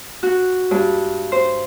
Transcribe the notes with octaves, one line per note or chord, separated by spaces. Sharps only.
F#4
G2
C5